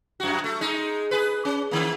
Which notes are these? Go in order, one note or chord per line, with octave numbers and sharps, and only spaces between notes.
F#2 F#4
A3
G#3 D#4
G#4 B4
C#4
D#3 A#3